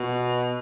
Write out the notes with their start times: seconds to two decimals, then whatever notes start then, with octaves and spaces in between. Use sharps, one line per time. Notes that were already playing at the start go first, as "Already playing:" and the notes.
Already playing: B2